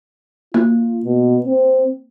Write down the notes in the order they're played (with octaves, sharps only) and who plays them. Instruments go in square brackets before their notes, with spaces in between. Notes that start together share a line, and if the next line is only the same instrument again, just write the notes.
[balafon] A#3 [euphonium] F4
[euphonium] B2
C4